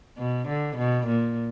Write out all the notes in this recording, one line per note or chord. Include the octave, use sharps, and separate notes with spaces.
B2
D3
B2
A#2